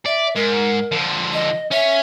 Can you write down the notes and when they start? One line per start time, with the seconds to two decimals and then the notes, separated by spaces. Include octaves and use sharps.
0.06 D5 E5
0.36 G#2 A#4
0.92 D3 F3
1.33 D#5
1.71 C#4 C#5 E5